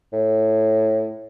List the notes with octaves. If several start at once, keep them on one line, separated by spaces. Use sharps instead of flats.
A2